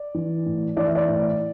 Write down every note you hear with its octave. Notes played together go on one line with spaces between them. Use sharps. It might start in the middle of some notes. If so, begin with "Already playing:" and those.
Already playing: D5
E3
A2
E3 D5
E5
D5
A2